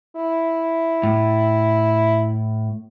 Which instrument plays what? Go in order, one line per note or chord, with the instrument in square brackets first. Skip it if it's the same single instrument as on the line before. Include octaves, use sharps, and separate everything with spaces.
[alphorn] E4
[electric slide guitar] A2